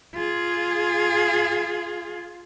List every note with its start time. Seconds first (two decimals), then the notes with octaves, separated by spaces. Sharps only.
0.15 F4 G#4